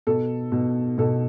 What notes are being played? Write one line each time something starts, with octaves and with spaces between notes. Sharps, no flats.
B2 A4
B2
B2 A4